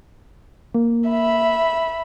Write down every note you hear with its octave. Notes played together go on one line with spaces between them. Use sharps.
A#3
E5 B5